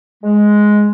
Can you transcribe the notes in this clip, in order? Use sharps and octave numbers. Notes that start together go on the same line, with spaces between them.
G#3